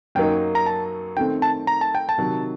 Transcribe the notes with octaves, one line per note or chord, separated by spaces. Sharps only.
F#2 F#3 A#3 D#4 G5
A#5
A5
D#3 A3 C4 G5
A5
A#5
A5
G5
A5
C3 D#3 F#3